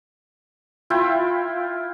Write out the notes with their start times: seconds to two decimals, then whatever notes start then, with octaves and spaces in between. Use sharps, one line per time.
0.90 E4 F4 E5 G5